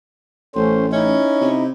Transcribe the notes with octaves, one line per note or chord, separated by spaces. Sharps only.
A1 A3 C#4 C5
C#4 D#4 E4
C3